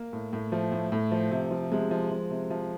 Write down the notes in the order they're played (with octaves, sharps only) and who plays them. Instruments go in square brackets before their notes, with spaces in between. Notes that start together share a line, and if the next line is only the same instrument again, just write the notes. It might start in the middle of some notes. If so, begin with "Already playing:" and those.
Already playing: [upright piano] A#3
A2
A2
F3 A3
A2
A2
F3
C3
F3
C3 G#3
F3
F3
C3
F3